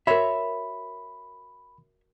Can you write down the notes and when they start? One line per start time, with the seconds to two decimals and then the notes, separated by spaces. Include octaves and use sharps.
0.07 F#4 A#4 C#5 E5 B5